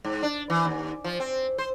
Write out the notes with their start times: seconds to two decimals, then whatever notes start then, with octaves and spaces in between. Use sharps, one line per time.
0.05 G#2
0.23 D4
0.50 E3
0.65 D#2
1.04 F3
1.20 C4
1.58 C5